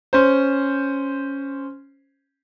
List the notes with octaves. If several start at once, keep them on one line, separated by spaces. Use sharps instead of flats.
C#4 C5